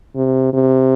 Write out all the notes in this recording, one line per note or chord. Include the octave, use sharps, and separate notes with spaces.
C3
C3